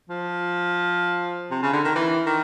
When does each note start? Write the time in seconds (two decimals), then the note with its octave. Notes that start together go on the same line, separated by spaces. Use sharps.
0.10 F3
1.51 C3
1.62 C#3
1.73 D3
1.85 D#3
1.95 E3
2.26 D#3